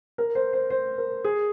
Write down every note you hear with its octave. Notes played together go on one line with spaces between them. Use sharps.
A#4
C5
C5
C5
A#4
G#4